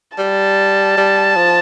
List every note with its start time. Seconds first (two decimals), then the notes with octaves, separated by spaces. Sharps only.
0.18 G3 A5
0.97 G3
1.37 F3